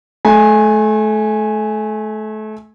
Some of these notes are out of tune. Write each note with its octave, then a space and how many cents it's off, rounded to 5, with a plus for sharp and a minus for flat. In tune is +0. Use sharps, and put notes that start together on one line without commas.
A3 -30 G#5 +0